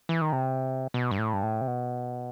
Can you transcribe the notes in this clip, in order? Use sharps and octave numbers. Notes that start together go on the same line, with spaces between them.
E3
D#3
C3
B2
G2
A2
G2
A2
C3
B2